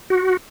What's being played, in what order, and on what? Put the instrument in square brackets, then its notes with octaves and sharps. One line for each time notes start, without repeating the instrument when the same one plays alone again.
[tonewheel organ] F#4